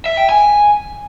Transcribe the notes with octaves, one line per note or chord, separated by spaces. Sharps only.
E5
G5
G#5